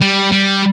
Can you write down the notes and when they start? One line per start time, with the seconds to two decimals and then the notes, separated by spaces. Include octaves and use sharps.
0.01 G3
0.32 G3